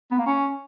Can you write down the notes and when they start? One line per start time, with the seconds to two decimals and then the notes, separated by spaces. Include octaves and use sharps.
0.11 B3
0.19 A#3
0.26 C#4